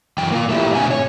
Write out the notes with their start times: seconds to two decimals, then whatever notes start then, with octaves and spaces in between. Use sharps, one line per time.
0.18 F#2 E3 G5
0.32 A#3 F4
0.49 A3 E4 G4
0.75 G#2 B2 C4 D4 G#5
0.91 C#5